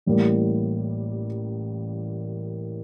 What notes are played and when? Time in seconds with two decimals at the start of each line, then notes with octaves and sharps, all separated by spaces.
0.06 A1 A2 G3 A#3